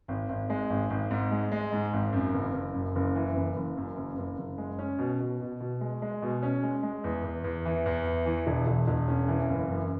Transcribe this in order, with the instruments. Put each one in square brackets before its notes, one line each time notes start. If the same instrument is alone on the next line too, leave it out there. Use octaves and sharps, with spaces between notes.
[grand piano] G#1
G#1
G#3
G#1
G#1
G#2
G#3
G#3
G#2
G#1
F#2
F#1
F#1
F#2
F#1
E3
F#1
F#1
F#2
F#1
F#1
F#1
G#3
C#4
B2
B2
B2
B2
G#3
G#3
B2
C#4
G#3
G#3
E2
E2
E2
E3
E2
E3
E3
E1
E1
E1
C#4
E3
F#1
F#2